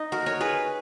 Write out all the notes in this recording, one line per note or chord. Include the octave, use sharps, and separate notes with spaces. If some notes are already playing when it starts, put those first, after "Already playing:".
Already playing: D#4
F#4 A#4
A#4 C#5
G#4 B4